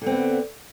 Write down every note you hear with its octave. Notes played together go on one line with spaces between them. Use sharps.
D3 B3 C4